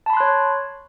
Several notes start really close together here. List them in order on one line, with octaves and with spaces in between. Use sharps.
A5 B5 C6 F#6 C#5